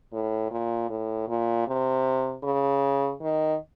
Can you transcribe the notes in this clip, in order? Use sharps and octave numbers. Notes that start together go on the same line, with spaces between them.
A2
A#2
A2
A#2
C3
C#3
D#3